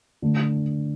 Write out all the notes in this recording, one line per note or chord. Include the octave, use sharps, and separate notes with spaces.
D3 A3